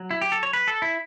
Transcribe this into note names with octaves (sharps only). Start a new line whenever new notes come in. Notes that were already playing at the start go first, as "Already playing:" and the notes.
Already playing: F#3
E4
G4
A4
C#5
B4
A4
E4